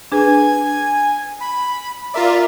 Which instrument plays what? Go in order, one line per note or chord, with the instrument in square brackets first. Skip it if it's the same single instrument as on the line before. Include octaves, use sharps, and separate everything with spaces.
[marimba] D4 G#4 B4 [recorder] G#5
[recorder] B5
[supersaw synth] F4 A#4 D5 [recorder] E5